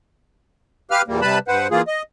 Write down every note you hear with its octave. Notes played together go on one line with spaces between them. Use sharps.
G4 B4 F5 F6
E2 A#2 G3 A#3
C3 G3 B4 A5 B5
G2 B4 C5 F#5
E3 A#3 F4 G#4
D#5